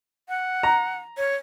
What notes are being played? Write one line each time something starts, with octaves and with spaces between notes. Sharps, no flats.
F#5
A#5
C#5